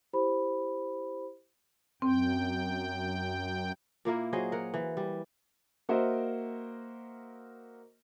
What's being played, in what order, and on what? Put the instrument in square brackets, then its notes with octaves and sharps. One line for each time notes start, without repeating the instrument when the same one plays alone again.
[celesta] E4 G4 C5 B5
[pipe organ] F#2 G5 [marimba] C4
[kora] A#2 A#3 E4 A#4
F#3 G#4 C5 D#5
A#4 F#5
E3
G3
[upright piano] A#3 F#4 A#4 C5 D#5 E5